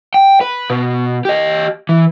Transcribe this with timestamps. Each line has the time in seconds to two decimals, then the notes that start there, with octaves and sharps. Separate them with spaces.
0.14 G5
0.41 B4
0.70 B2
1.25 G4 D#5
1.89 E3